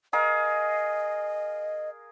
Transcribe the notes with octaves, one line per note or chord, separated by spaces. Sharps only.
G#4 A#4 D#5 F5